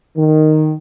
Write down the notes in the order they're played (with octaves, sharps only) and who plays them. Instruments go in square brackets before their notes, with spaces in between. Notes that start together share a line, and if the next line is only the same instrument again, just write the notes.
[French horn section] D#3